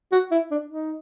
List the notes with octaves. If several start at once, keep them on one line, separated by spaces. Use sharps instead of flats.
F#4
E4
D4
D#4